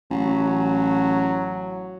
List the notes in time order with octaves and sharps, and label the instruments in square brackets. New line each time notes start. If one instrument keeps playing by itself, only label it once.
[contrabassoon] A1 [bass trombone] F#3